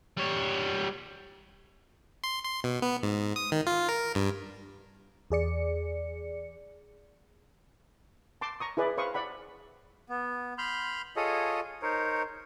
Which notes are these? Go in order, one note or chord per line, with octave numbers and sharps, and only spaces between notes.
G3 C#5
C6
C6
B2
B3
G#2
D#6
D#3
F4
A#4
G2
E2 G#4 D5 C#7
A5 C6 D6
A#5 C#6 D#6
E4 G#4 B4 D5
B4 C5 F5 C#6 D#6
D5 F#5 B5
B3
B5 C6 F6 G6
F4 G#4 A4 C#5 D#5
D#4 A#4 C5 C#5